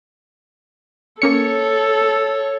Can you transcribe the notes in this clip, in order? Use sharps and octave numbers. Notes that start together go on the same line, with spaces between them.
A#3 C#4 A4 C#5 C#7